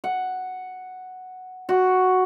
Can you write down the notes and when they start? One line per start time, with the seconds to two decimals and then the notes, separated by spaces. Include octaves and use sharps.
0.04 F#5
1.69 F#4